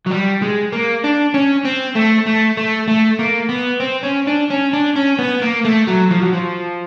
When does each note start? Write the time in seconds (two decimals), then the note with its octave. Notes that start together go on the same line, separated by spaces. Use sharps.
0.06 F#3
0.11 G3
0.42 G#3
0.73 A#3
1.04 D4
1.34 C#4
1.65 C4
1.96 A3
2.27 A3
2.57 A3
2.88 A3
3.19 A#3
3.49 B3
3.80 C4
4.03 C#4
4.27 D4
4.50 C#4
4.73 D4
4.96 C#4
5.19 B3
5.42 A#3
5.65 A3
5.88 F#3
6.11 F3
6.22 F#3
6.34 F3